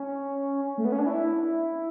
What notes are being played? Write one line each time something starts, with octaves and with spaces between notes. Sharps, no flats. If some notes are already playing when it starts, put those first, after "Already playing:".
Already playing: C#4
A3
B3
C#4
D4
E4